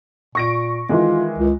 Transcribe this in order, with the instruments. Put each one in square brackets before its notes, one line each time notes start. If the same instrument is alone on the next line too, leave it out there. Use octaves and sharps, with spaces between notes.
[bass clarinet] A#2 [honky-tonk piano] C#6 A#6 D7
[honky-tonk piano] D#3 E3 G#3 [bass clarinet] F4
[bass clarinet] C#2